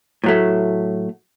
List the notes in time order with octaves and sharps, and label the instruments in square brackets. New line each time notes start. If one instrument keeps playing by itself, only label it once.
[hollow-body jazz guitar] A2 F#3 A3